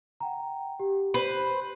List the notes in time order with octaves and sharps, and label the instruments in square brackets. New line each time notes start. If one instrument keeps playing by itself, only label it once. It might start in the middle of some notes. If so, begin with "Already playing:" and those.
[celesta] F#5 G5 A#5
G4
[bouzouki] B4 C5